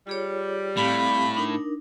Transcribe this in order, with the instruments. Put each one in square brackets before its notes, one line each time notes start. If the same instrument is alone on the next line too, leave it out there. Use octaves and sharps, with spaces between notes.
[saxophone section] G3 [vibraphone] F4 G#4 C#5
[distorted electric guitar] A2 [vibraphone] C4 G4 F5 [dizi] B5
[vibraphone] D4 D#4 A#4